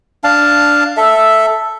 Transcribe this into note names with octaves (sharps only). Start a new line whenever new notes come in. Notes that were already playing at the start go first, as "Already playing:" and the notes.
D4 F5 A5
A4 E5